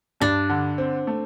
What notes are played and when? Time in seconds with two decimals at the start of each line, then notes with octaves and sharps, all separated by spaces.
0.21 G2 D4
0.49 D3
0.78 C4
1.07 A3